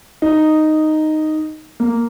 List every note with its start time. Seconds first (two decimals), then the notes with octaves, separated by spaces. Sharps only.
0.22 D#4
1.80 A#3